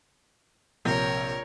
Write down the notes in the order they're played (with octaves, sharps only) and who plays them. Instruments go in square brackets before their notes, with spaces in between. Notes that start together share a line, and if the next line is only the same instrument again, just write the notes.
[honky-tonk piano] A#1 C3 G6 [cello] A#4 C#5